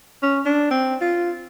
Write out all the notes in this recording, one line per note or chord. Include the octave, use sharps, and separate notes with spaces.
C#4
D4
C4
F4